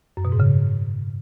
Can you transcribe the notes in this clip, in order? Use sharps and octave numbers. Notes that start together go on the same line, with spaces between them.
F#2
B2
G#2
C#3